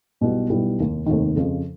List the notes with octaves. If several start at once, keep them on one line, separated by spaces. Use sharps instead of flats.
B1 B2 G3 B3 E4
B1 B2 G3 B3 E4
F1 D#2 D#3
F1 D#2 D#3
F2 C#3 F3